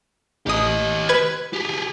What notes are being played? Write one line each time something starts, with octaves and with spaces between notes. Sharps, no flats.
A1 G4 D#5 D#6
B4 G#6
G4 G#4